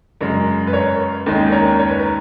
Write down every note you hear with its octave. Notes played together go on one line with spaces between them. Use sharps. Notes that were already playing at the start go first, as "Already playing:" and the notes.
F#2 C#3 G#3 A#4
B4
A#4 C#5
D#2 D#3 G#3 C#4
A#4 C#5
C#5
B4
A#4